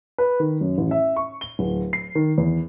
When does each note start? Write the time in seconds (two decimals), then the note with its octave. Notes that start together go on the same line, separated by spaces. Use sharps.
0.18 B4
0.40 D#3
0.61 F#2
0.78 A1
0.91 E5
1.16 C#6
1.41 G7
1.59 D1
1.93 C7
2.15 D#3
2.38 E2